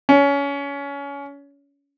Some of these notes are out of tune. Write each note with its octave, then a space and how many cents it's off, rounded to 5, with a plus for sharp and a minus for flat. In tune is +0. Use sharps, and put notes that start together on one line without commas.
C#4 +25